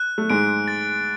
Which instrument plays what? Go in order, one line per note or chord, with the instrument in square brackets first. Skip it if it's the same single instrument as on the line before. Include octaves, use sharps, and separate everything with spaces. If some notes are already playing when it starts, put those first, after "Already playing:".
Already playing: [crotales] F#6
[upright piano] A3
[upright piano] G#2 G#3 [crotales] D7
[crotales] A6